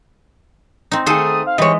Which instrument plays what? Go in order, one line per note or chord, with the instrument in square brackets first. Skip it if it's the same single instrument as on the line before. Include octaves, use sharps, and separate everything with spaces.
[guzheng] C4 D#4
[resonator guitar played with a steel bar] D#3 A3 G#4 [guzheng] A4 C5 F#5 [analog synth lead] D#6
[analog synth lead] F5
[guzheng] E3 G#3 [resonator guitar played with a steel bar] G3 C#5 [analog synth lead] D#5